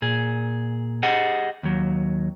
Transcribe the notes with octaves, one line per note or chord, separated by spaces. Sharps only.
A#2 G#4
G4 G#4 D#5 F#5
D#2 F#3